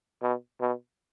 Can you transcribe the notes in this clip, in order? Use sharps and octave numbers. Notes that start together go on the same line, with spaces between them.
B2
B2